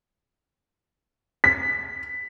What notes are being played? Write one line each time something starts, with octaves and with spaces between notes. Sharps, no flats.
B6